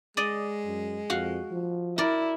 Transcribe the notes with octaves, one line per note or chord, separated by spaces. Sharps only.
G#3 D5 D#5
F#2
F2 F#4 F5
F3
E4 A#4 D5